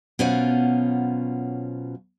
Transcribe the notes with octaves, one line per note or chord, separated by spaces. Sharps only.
B2 F#3 C#4 F4 C5 F#5